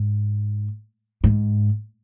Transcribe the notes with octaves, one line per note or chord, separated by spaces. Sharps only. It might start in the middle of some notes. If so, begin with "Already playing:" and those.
Already playing: G#2
G#2